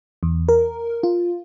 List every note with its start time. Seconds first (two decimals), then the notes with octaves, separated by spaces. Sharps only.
0.23 E2
0.49 A#4
1.03 F4